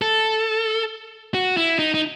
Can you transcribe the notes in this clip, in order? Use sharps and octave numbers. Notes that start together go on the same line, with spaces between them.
A4
F#4
E4
D#4
D#4